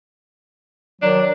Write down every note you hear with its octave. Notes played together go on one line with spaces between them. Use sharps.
D#3 F#3 D4